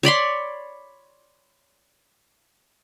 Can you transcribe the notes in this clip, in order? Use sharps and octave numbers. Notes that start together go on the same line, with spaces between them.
C#5 D5 B5 C6